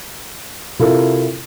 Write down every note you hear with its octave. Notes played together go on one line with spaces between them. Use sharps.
C3 E4 F4 A4 A#4